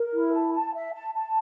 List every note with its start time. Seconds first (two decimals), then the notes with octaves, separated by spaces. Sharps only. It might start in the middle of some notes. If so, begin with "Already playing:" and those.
Already playing: A#4
0.13 E4
0.33 A5
0.54 A5
0.74 E5
0.93 A5
1.14 A5